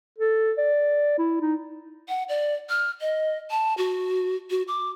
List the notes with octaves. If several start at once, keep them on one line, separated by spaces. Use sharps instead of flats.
A4
D5
E4
D#4
F#5
D5
F6
D#5
A5
F#4
F#4
D6